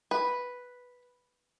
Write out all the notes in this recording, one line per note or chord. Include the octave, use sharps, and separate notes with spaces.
B4